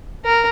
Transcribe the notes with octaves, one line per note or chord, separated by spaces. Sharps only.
A#4